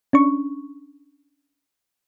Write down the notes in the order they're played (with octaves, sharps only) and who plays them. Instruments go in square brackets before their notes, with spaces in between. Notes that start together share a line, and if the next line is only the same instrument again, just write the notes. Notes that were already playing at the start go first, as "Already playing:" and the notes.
[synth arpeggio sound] C#4 D4 C#6